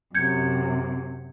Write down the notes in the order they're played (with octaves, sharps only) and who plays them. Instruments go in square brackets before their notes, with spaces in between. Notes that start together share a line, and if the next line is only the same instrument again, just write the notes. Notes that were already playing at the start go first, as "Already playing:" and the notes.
[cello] F#2 C3 [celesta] G6 G#6 C#7